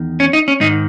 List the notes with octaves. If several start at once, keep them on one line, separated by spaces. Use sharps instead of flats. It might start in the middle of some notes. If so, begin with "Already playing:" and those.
Already playing: E2 D#3
C#4
D#4
C#4
G#2 D#3 D#4